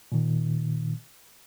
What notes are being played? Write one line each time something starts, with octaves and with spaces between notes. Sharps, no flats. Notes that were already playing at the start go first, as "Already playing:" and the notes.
A#2 D#3